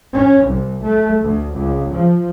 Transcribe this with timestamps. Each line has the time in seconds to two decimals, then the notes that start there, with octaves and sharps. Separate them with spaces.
0.13 C#4
0.45 C2
0.82 A3
1.22 D2
1.54 C#2
1.91 F3